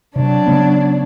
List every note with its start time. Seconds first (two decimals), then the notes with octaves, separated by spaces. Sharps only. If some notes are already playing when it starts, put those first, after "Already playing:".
0.16 C3 F#3 D4
0.47 C#3 B3